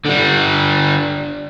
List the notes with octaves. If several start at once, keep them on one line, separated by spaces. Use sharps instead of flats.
D3 G3